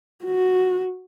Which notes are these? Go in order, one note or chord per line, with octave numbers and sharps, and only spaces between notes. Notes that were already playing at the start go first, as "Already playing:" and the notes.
F#4